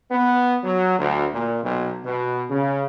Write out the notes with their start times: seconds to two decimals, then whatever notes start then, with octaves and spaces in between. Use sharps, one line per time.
0.11 B3
0.64 F#3
0.99 D2
1.33 A#2
1.63 B1
2.05 B2
2.50 C#3